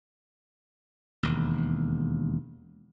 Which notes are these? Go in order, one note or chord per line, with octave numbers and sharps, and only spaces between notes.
E1 D#2